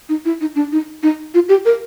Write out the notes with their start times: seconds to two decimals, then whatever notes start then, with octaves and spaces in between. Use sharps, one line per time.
0.09 D#4
0.25 E4
0.41 D#4
0.55 D4
0.72 D#4
1.03 D#4
1.34 F4
1.49 G4
1.65 A#4